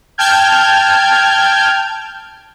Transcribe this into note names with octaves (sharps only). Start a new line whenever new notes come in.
G5 A5 F6 G6 G#6